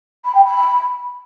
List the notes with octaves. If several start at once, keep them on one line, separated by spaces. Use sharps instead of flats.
B5
G5
B5